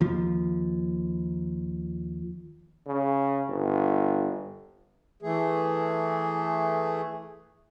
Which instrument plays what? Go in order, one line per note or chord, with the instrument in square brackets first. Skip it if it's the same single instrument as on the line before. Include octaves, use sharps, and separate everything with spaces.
[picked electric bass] D#2 F3
[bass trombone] C#3
G1
[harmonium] E3 A3 G#4